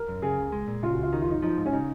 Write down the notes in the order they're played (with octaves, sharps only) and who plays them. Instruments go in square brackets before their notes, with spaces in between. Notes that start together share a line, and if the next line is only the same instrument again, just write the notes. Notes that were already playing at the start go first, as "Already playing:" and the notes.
Already playing: [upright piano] A#4
[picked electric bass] F#2
[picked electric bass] C#3 [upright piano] G#4
[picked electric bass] C#2
G#3
A#2
[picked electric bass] C#3 [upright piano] F4
[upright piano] F#4
[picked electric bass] C#2
[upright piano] F4
[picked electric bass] D#3 [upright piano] D#4
[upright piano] F4
[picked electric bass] F#2 [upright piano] D#4
[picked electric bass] F3 [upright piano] D#4
[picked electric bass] G#2
[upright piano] C#4
[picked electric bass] C#3 [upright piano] D#4